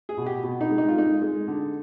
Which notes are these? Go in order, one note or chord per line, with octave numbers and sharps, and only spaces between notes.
G#4
B2
G4
B2
D#4
G#3
D#4
F4
G#3 D#4
G#3
D3